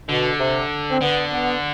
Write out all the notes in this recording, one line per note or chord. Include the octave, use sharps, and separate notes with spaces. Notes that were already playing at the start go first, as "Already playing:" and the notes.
B2 D3
C3
C4
D3 B3
B3